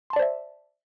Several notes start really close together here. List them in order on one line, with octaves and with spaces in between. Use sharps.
C6 A5 D5 C5 E5